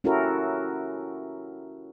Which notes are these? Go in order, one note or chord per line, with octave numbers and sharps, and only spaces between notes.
C#4 E4 F#4 G4 A4 A#4